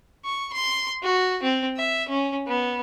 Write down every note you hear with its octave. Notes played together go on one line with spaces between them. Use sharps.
C#6
C6
F#4
C4
E5
C#4
B3